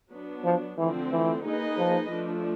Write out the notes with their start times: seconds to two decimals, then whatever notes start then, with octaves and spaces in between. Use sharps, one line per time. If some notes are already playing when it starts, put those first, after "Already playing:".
0.12 F#3 B3 D4
0.45 F3
0.78 D3 E3 F3 A3 C4
1.12 E3
1.44 A#3 D#4 G#4 B4 D#5
1.77 F3
2.10 F3 A3 D4